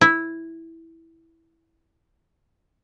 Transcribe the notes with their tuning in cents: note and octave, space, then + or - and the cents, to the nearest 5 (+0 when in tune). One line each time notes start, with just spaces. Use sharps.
E4 -5